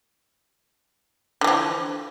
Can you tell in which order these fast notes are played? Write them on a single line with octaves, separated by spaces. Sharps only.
D3 E3 F3